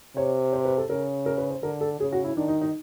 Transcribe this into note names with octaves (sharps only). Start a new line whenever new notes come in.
C3 C#5
C5
B4
A4
C#3 A#4
A#4
B4
C5
D3 A#4
A4
C#3 G#4
F#4
E4
D#3 D4
D#4
D#4